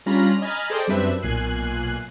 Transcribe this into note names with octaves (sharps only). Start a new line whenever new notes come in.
G3 C#4 D4 F4 A#5 B5
D#5 G#5 A#5 B5 F6 A6
G#4 A4 C5 D5 D#5 G5
F#2 G3 C4 D4 B4 E5
B1 A#2 G#5 F#6 C7